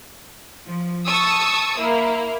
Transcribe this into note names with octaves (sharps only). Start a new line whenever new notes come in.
F3
A5 C#6 D#6 E6
A#3 E4